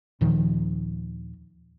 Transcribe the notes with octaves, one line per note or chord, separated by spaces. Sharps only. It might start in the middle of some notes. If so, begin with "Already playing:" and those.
D#2 A#2 D#3 F3